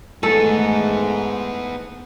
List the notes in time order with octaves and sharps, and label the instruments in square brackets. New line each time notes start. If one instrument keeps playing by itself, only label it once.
[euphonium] G#2 [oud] A3 [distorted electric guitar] B3 G#4 [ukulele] A4